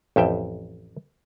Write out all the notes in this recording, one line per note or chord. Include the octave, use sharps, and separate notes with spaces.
A1 F2 E5 G5